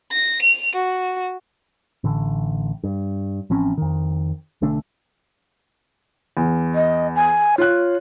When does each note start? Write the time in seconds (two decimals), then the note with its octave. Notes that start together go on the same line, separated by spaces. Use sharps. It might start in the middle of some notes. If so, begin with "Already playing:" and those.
0.12 A#6
0.42 F7
0.75 F#4
2.04 A1 D3
2.84 G2
3.50 A1 F3 C4 C#4
3.78 F2 D#3
4.62 B1 D3 A3 D4
6.37 E2
6.75 D#5
7.15 G#5
7.58 F4 C#5 F#6